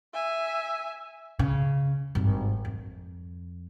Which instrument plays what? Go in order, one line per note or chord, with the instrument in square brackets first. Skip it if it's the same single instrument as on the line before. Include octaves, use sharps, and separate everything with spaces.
[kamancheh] E5 G#5
[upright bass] C#3
G#1 G2
F2